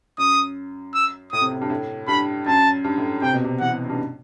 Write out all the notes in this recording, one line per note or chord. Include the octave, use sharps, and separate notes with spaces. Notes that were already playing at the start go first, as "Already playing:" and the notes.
F#2 D#6
E6
A2 D#6
C3
A2
G2
A2
G2 B5
F#2 A5
G2
A2
C3 G5
B2
C3
E3 F#5
C3
F#2
G2